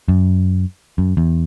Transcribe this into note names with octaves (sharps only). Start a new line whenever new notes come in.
F#2
F#2
E2